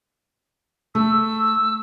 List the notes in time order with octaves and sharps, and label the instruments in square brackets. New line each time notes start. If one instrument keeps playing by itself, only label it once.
[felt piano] A3 [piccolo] E6